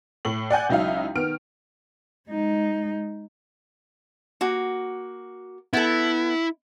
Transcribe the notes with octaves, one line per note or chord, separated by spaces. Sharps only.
A2 F#7
D5 F#5 G#5 G6
C#2 F#3 D#4 E4 F5
D#3 B3 F6 D7
G#3 D#4
A#3 F#4
B3 E4 A4